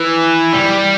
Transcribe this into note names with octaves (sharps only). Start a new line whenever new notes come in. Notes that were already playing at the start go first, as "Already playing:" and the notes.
Already playing: E3
G3